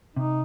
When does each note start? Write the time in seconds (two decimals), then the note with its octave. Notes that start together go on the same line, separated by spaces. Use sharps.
0.16 C3 D#4